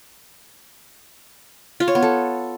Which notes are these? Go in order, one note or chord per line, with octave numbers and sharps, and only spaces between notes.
F4
C#5
B3
A4